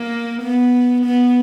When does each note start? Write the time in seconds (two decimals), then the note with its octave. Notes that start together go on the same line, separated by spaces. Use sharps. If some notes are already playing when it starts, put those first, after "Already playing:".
Already playing: A#3
0.42 B3
1.05 B3